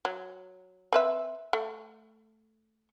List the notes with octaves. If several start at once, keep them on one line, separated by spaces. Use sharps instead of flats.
F#3
C4 B4 E5
A3